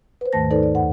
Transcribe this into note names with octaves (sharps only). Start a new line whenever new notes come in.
B4 C5
D#2 G#2 D#3 A3 A5 A#6
D#4 A4 B4 C5 D5
D5
E2 G2 F#5